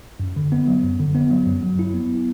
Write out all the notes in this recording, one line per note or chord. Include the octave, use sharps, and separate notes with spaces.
F#2
D3
B3
F#3
F#2
D3
B3
F#3
F#2
F#3
E4
B3